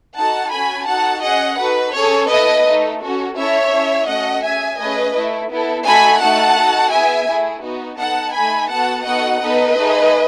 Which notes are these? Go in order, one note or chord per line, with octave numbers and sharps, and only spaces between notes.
D#4 F#4 A4 F#5 A5
C#4 F#4 A4 G#5 B5
D#4 F#4 A4 F#5 A5
C#4 G#4 D#5 F#5
D#4 F#4 A4 B4
C#4 G#4 A4 C#5
B3 E4 A4 B4 D#5
A3 D#4 A4
C#4 F#4 A4
C#4 E4 A4 C#5 E5
C#4 E4 A4
A3 C#4 F#4 A4 D#5 F#5
C#4 G#4 E5 G#5
A3 C#4 G#4 B4 D#5
A3 E4 A4
B3 E4 A4
A3 D#4 F#4 A4 G#5 B5
A3 D#4 F#4 A4 F#5 A5
D#4 F#4 A4
B3 E4 G#4 E5 G#5
A3 E4 G#4
B3 D#4 F#4
B3 D#4 A4 F#5 A5
A3 D#4 A4 G#5 B5
B3 F#4 A4 F#5 A5
B3 D#4 F#4 A4 D#5 F#5
B3 D#4 A4 B4 D#5
A3 D#4 G#4